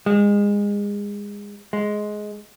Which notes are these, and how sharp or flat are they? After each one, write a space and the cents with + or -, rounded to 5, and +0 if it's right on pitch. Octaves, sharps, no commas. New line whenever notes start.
G#3 -25
G#3 +10